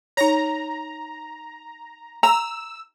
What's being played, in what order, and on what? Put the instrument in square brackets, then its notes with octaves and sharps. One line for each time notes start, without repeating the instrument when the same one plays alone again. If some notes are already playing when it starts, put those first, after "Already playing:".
[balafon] D#4 C#5 [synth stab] A#5
[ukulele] A#5 [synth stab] E6